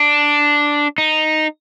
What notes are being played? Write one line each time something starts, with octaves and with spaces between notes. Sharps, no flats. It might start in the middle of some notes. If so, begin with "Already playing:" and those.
Already playing: D4
D#4